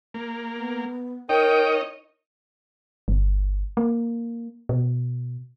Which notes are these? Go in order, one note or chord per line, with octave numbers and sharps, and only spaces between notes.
A#3
B3
D#4 A#4 C#5 D#5 G5
G1
A#3
B2